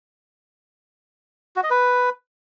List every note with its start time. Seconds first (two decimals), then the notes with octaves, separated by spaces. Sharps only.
1.56 F#4
1.63 D#5
1.70 B4